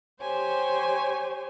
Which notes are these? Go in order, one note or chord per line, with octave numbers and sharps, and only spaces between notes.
G4 C5 C#5 G#5